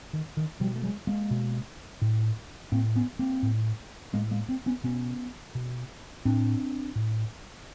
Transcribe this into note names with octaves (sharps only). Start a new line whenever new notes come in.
D#3
D#3
B2 F3 G3
A3
F#3 G#3
G#3 A#3
B2
A2
A2 A#3 C4
B3 C#4
A#3 C4
A2
A2 G#3 A#3
G#3 A#3
A#3 C4
B3 C#4
B2 B3 C#4
B2
A2 C4 D4
A2